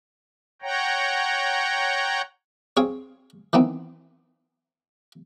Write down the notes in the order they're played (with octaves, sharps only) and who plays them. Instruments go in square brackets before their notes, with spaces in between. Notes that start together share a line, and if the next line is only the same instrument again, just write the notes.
[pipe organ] C#5 F#5 G5 A#5
[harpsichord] C4 G#4 C#5 F5
D#3 E3 B3 C4